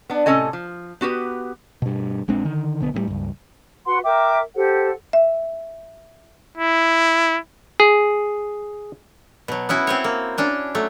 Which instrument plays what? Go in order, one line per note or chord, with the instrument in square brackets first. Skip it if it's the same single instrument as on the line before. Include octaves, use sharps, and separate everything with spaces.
[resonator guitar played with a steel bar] B3 D4
A2 C3 C#4 A4 D#5 G#5
F3
B3 F#4 G4 B4
[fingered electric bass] G2 B2
A#1 G#3 C4 D4
D3 D#3
B1 D3 B3
A2 C#3 G3
C#2 G2
[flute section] F#4 B4 F#5 C6
A#4 E5 G5 D6
G4 A4 C5 F#5
[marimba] E5
[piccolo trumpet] E4
[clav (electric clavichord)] G#4
[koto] B2 F#3
B3 C#4 E4 F#4
C4 C5 C#5
A#3
C#4 D4 A5
F#3 A3